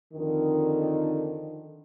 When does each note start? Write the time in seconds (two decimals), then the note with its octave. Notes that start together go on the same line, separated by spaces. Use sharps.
0.13 F2 D3 D#3